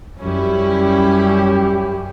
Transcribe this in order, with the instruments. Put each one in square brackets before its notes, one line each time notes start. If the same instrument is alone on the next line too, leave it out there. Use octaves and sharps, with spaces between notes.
[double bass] F#2 [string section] G3 C#4 E4 [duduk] G4